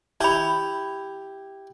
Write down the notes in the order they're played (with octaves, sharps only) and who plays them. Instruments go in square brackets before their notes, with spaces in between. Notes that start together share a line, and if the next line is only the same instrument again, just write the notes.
[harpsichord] E4 G4 [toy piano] A5 B5